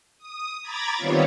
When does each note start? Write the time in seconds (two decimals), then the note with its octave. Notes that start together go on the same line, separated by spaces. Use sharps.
0.18 D#6
0.62 A#5 B5 D6 G#6 A6
0.96 D#3 G3 B3 C4 F4 C#5